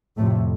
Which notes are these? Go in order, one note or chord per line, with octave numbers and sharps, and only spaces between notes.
F2 A2 C3 A3